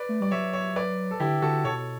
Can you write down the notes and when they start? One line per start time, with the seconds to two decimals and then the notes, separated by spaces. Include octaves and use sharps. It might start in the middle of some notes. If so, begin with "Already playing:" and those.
Already playing: B4 D5
0.09 A3
0.20 G3 D5
0.31 F#3 C#5 E5
0.53 C#5 E5
0.76 B4 D5
1.11 A4
1.20 D3 E4 G4
1.42 D3 F#4 A4
1.64 B2 A4 C#5